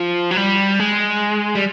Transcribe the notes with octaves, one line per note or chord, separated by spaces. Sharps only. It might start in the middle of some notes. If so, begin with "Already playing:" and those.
Already playing: F3
F#3
G3
G#3
G3